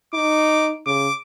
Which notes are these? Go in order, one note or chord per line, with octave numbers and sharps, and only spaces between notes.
D#4 D6
C#3 D6